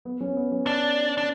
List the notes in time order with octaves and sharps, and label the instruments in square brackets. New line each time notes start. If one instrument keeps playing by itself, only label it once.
[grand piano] B3
C#4
B3
C#4
[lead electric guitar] D4
D4